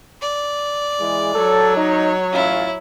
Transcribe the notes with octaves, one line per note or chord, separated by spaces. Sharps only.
D5
E3 G#3
F#3 A4 C#5
D#4
A1 C#4 E4 F4